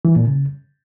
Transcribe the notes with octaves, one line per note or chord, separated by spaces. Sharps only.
E3
A#2
C#3